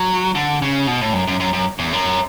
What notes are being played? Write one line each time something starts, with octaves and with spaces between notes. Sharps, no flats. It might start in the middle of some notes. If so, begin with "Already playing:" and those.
Already playing: F#3
D3
C#3
B2
A2
F#2
F#2
F#2
F#2
E2
F#2